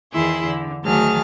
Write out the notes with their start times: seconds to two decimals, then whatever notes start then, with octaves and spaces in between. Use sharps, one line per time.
0.12 E2 D#3 E4 G#4 C6
0.45 D3
0.85 D2 D#3 F#3 G#4 A5 F6